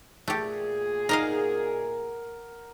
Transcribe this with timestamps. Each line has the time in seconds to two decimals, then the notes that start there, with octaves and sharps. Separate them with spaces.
0.28 A#2 A3 G4 G#4
1.09 D#4 A#4 D#5 F5 F#5